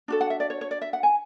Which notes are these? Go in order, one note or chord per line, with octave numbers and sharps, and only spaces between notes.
D4 F#4 A4
F#5
E5
D5
C#5
C#5
D5
E5
F#5
G#5